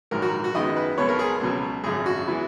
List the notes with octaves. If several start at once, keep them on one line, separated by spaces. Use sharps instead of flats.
A#1 G#2 D#3 F#3 A#4
F#4
F#4
F#2 D#3 G#3 B3 D#5
B4
B1 B2 G#3 B3 C#5
A#4
G#4
C#2 B2 F#3
G#1 F#2 C#3 G#4
F#4
E3 G#3 B3